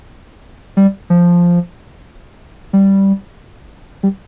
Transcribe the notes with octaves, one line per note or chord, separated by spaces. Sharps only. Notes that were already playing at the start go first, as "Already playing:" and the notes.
G3
F3
G3
G3